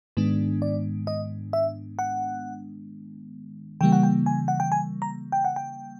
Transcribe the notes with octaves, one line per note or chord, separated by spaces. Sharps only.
G#2 D#3 G#3 B3 D4
D5
D#5
E5
F#5
C#3 E3 G3 A#3 G5
F#5
G5
G#5
F#5
G5
G#5
A#5
G5
F#5
G5